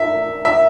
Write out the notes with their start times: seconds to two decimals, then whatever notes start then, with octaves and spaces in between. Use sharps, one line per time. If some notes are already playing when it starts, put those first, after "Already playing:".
Already playing: E5
0.45 E5